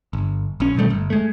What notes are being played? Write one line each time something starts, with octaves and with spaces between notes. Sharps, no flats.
G1
A#1 C#4
B2 D#3 G3 A3
G1
G#3 A3